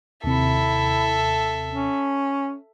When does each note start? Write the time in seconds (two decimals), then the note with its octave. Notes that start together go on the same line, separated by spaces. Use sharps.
0.24 D#2 C3 E4 A4 E5
1.70 C#4